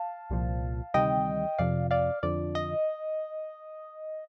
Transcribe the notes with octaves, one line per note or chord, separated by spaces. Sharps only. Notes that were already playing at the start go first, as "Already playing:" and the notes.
Already playing: F5 A5
C2 A#2 F3
D2 C3 D#3 G3 D#5 G5
F2 C3 F3 D5 F5
D5 F5
F2 D3 F3 D5
D#5